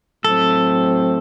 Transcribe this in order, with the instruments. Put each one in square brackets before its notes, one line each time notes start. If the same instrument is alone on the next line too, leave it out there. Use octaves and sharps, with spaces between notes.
[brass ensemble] A2 F#3 A3 C4 [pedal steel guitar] A4